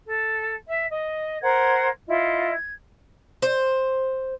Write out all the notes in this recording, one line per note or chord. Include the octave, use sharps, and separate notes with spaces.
A4
E5
D#5
A#4 C5 F#5 G#6
E4 F4 D#5
G#6
C5